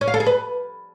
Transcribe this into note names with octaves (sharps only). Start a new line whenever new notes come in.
C#4
F5
A4
G#4
B4